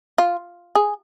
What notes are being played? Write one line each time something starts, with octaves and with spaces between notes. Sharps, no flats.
F4
G#4